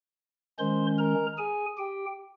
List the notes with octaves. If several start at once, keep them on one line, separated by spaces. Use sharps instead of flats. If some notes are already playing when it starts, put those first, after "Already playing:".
D#3 G#3 C#4 C5 C6
A#4 A#5
G#4 G#5
G4 G5